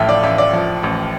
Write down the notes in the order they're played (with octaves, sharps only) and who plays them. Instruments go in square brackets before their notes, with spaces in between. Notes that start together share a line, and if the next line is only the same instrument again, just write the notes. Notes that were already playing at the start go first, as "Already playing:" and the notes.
Already playing: [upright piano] A1 A2 F3 E5 F5 G5 A5
D5
A1 E5
D5
F3
A1